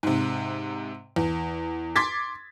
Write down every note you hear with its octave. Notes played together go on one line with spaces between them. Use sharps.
G#2 C3
E2
C6 D6 G#6 A6 B6